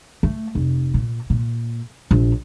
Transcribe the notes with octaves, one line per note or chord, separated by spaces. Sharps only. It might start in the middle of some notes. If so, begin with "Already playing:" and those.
A3
F1
A#2
A#2
A#1